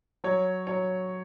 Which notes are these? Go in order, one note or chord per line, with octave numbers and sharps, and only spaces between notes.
F#3 C#5
F#3 C#5